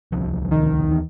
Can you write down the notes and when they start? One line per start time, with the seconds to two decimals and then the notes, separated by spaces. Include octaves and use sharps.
0.12 D1 C2 F3
0.51 D#3
0.87 D#2 E3